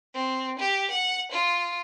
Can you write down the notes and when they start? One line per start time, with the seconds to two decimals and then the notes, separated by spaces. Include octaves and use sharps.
0.14 C4
0.59 G4
0.91 F#5
1.32 F4